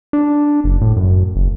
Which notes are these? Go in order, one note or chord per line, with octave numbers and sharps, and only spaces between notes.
D4
F#1
A2
F#2
F#1